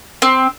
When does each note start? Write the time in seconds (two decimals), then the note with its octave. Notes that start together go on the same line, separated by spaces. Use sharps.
0.22 C4